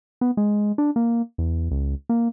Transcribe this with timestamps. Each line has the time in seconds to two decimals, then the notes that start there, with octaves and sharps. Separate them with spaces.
0.21 B3
0.37 G#3
0.78 D4
0.96 A#3
1.38 E2
1.71 C#2
2.09 A#3